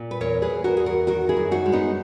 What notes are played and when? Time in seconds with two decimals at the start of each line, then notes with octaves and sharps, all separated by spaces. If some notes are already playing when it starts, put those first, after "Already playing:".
Already playing: A#2
0.11 B4
0.21 E2 A#4 C#5
0.42 G#4 B4
0.50 E2
0.64 F#4 A#4
0.77 E2 G#4
0.86 F#4 A#4
1.07 D#3 F#4 A#4
1.29 E4 G#4
1.37 F#2
1.51 D#4 F#4
1.66 G#3
1.72 B3 D#4